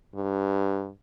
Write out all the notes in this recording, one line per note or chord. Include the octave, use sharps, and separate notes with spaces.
G2